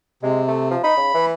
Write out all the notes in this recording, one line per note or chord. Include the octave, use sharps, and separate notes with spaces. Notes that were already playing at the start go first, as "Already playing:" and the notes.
C3 G#3
A3
F3
D#4 B5
C#3
E3